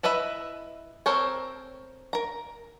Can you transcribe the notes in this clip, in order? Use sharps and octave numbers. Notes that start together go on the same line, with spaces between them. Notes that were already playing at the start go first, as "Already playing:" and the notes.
E4 B4 D#5 E5 B5
C4 A4 A#4 C5 C#5
A#4 A#5